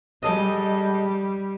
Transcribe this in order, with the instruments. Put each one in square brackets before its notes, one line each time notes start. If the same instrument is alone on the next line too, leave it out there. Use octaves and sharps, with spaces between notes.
[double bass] G3 [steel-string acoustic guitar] G#3 A4 D#5